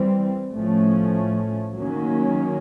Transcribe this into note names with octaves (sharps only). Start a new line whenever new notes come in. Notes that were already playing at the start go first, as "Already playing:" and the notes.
Already playing: E3 G3 C4
A2 F3 A3 C#4
D#3 F#3 A#3 C#4